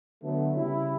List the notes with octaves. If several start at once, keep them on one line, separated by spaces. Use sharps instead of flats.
D3 F#3 A3 B3
C#3 G3 E4